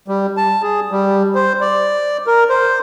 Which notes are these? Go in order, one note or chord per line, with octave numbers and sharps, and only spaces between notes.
G3
A5
G#4
G3
C5
D5
A#4
C5